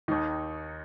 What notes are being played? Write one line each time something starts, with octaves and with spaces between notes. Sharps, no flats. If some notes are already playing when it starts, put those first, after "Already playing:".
D#2 D#3 D#4